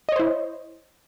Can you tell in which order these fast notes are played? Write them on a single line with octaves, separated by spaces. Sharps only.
D#5 C#5 C5 E4